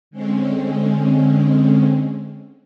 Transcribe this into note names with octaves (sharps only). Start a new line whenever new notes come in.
D3 G#3 C4 C#4